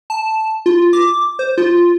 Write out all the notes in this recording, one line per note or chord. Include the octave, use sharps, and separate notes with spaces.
A5
F4
D6
C5
F4